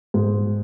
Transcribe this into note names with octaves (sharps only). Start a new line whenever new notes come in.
G#2